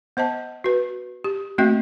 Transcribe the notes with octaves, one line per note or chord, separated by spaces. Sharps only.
B3 C5 D#5 A5
F#4 B4
G4
A3 A#3 C4 F#4 D#5 G5